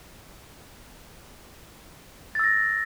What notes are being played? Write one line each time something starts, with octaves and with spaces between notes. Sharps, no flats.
E6 A6 A#6